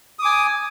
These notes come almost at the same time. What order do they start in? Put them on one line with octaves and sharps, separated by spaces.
D#6 D6 G#5